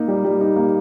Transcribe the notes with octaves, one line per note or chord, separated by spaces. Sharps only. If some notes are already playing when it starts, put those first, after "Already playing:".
Already playing: A#3 D#4
G3
G3
D#4
A#3